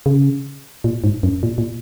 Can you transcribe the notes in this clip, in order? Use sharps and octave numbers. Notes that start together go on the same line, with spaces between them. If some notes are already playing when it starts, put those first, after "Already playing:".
C#3
A#2
G#2
F#2
A#2
A#2